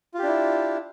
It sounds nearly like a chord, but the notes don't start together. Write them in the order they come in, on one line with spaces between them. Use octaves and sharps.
F4 G4 D4 E4